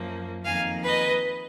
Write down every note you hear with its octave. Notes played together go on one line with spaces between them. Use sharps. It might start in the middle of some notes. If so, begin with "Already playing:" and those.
Already playing: F#2 F3 A#3
F2 D#3 A#3 F5 G#5
B4 D#5